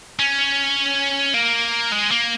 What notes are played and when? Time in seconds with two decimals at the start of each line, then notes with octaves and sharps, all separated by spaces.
0.19 C#4
1.34 A#3
1.92 G#3
2.11 A#3